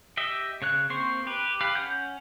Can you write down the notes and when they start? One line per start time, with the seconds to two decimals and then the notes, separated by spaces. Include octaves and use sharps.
0.17 G4 D#5 E5
0.62 C#3 C#5 F#6
0.90 A#3 C4 C5 C6 C#6
1.27 G4 B4
1.61 G4 B4 F5
1.75 C#4 F#5 G6